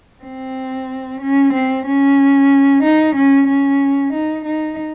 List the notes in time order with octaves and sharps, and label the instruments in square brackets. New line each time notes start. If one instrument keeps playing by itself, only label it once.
[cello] C4
C#4
C4
C#4
D#4
C#4
C#4
D#4
D#4